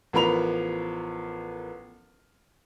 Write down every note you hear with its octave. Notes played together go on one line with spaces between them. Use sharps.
A1 F3 B3 A#4 B5 F7